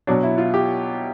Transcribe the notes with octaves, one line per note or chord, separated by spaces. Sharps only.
B2 F#3 D4
E4
F4
G4